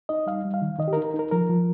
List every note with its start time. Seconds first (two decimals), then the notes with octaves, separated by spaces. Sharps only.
0.09 D#4 D#5
0.26 G3 F5
0.45 G3
0.54 F5
0.62 D#3
0.79 D#3 D#5
0.88 G4
0.93 A#4
0.97 D#4
1.05 A#4
1.14 D#4
1.19 A#4
1.31 F3 A#4
1.50 F3